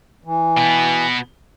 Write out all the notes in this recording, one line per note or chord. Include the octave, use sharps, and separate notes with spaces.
E3
B2 B3